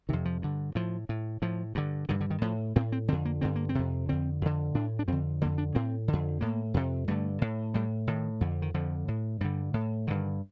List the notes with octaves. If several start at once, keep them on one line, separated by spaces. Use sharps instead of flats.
F2 C3 D#3
F3
G2 D3
A2 F3
A2
A2 F3
G2 D3
G2 D3 D#3
D3
D#3
A2 F3
A2 C4
C4
F2 D3 C4
A#3
G2 D3 C4
A#3
C4
F2 C3
F2 D3 C4
F2 D3
A2 D4
D4
F2 D3 C4
F2 D3 A#3
D4
A2 C4
D3
F2
A2 A#3
F2 C3
G2 D3 A3
A2
A2 G3
A2 D#3
F2 D3
D#3
F2 D3 F3
A2
G2 D3 G3
A2
G2 D3 D#3